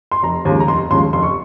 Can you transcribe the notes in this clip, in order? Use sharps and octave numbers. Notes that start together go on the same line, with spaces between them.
C6
F1 A#5
D#2 C#3 F3 G#3
A#5
F1 C6
D#2 C#3 F3 G#3 C6
F1 C6
C#6